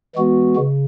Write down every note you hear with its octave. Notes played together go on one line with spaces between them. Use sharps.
E3 G#3 B3 F#4
C#3